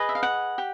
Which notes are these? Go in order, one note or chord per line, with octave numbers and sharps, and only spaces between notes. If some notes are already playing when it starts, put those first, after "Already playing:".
Already playing: G#4 B4 D#5
E5
F5
F#5
G4